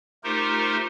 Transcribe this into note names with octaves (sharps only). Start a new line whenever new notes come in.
A3 D#4 F4 G4 A#4 C5